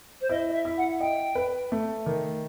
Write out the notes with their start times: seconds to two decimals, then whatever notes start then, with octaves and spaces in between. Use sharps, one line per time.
0.21 C5
0.29 E4 D#5
0.47 D#5
0.53 E5
0.65 E4
0.77 F#5
1.00 D#5 G5
1.35 B4
1.72 A3
2.06 D#3